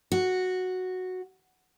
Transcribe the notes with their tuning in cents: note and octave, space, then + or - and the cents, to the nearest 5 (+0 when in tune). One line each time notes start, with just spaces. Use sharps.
F#4 -5